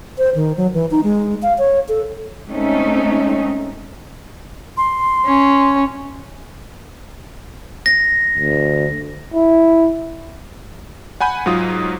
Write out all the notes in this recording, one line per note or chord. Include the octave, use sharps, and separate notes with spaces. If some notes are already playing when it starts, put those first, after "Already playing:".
C5
D#3
F#3
E3
D#4
G#3
F5
C#5
A4
G#3 A3 C4 C#4 D#4
C6
C#4
A#6
D2
E4
F#5 G#5 B5 G6 D#7
G#2 F#3 F4 D#6